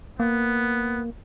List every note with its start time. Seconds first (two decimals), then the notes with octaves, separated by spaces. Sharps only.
0.20 A#3 B3